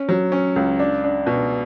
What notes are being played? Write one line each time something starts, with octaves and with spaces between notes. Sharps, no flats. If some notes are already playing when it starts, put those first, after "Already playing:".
Already playing: C#4
F#3
C#4
C#2
D4
D4
B2